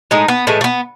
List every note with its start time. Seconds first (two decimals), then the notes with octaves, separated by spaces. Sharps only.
0.11 A2 G#3 D#4
0.28 B3
0.47 A2 E3 G#3 A3
0.61 A3
0.64 B3